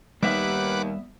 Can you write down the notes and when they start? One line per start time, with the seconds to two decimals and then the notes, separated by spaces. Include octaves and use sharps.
0.23 D#2 G3 B3 B4 E5 F#5 D6